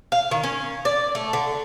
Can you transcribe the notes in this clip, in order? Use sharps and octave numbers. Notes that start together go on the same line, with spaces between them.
F5
D#3
C#4
D5
A3
D3